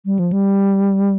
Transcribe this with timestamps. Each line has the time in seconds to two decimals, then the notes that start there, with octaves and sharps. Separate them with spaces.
0.06 G3
0.19 F3
0.33 G3